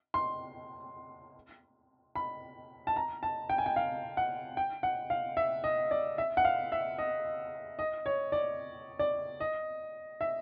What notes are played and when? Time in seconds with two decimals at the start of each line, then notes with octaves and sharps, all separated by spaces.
0.14 C6
2.15 B5
2.87 A5
2.96 A#5
3.23 A5
3.49 G5
3.58 G#5
3.66 G5
3.76 F5
4.17 F#5
4.57 G5
4.83 F#5
5.10 F5
5.37 E5
5.64 D#5
5.91 D5
6.18 E5
6.37 F#5
6.45 F5
6.72 E5
6.98 D#5
7.79 D#5
8.06 C#5
8.32 D5
8.99 D5
9.40 D#5
10.21 E5